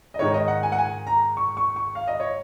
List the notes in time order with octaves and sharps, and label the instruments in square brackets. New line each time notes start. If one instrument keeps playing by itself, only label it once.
[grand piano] D#5
G#2 D#3 G#3 C#5
D#5
F#5
G#5
F#5
G#5
A#5
C#6
C#6
C#6
F5
D#5
C#5